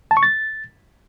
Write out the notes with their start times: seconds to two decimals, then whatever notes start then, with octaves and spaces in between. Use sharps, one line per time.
0.11 A5
0.17 C#6
0.23 A6